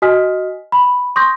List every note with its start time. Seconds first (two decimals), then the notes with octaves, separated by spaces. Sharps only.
0.02 F#4 D#5 G#5 D#6 F6 B6
0.72 B5
1.16 C6 C#6 D#6 G6 A#6